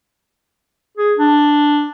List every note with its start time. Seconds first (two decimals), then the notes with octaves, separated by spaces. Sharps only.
0.97 G#4
1.17 D4